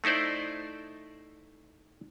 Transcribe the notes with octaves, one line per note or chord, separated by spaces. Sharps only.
A3 D#4 E4 C5 D5